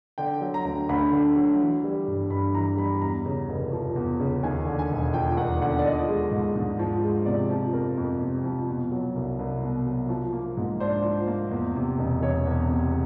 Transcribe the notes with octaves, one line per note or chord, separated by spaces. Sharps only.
D3 G5
F#3
A#5
D2
D2 B5
D3
F#3
E3
G3
G2
G2 B5
E3 A#5
G3 B5
E2 A#5
C#3
F1
F3
E2
C#3
D#2 G#5
D3
G#5
E1
F3 G5
D#2 F#5
D3 F#5
D5
F3 D#5
G#3
G#2
G#2
F3
G#3
C3 D5
F3
F2 A#4
F2
C3
F3
B2
F#3
C2
C2
B2
F#3
F3
A#3
G#2
D4 C5
F3
A#3
E2
C3
E1
E1 C#5
E2
C3